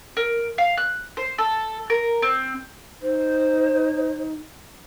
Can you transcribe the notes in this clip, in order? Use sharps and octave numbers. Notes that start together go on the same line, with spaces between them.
A#4
F5
F#6
C5
A4
A#4
C4
D#4 C5